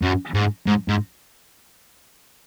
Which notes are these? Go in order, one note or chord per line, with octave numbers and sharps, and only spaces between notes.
F#2
G#2
G#2
G#2